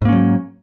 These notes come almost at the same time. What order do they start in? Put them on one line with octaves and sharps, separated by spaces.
G#2 A#3 C#4 F#3